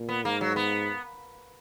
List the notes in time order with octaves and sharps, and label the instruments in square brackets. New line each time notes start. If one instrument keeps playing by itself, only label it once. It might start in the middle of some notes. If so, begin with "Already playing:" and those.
Already playing: [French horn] A#2
[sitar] B3
[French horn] G#2 [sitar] A#3
[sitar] F#3
B3